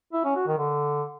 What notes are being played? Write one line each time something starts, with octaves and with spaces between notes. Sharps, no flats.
E4
C#4
F#4
D#3
D3